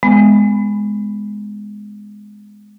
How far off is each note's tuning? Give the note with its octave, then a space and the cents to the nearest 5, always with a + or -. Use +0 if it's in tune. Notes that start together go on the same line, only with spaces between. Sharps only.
G#3 +0 B3 +20